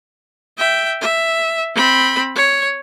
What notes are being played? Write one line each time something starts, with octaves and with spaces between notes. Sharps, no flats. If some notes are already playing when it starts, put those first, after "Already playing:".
E5 G5
E5
C4 B5
C#5